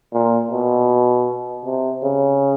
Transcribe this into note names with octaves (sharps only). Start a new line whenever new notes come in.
A#2
B2
C3
C#3